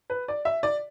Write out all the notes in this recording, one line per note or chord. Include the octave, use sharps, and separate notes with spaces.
B4
D5
E5
D5